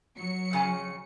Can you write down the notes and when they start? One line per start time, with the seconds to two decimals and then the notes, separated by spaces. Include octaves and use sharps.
0.16 F#3 C#7
0.51 F2 C#3 G#5